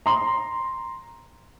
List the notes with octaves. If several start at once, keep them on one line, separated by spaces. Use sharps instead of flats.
A#5 C6